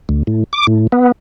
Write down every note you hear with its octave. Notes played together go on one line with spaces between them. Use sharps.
D2
A2
D6
A2
B3